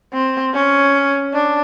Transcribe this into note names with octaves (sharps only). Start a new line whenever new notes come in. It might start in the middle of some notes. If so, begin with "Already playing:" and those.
C4
C#4
D4